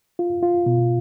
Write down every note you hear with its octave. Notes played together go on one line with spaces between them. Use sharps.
F4
F4
B2